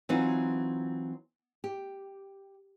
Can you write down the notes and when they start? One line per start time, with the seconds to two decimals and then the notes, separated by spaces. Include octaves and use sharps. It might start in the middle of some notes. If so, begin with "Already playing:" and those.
0.09 E3 F#3 C4 D#4 F4 F#4
1.64 G4